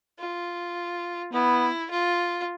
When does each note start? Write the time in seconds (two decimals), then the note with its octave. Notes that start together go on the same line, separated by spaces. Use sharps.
0.19 F4
1.33 B3 E4
1.91 F4